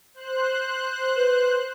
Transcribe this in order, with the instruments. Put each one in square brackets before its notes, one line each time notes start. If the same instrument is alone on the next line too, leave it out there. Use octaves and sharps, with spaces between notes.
[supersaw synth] C5 F#6
[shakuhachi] B4